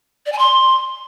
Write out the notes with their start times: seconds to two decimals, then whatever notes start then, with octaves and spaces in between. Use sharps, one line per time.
0.26 D5
0.32 G#5
0.39 C6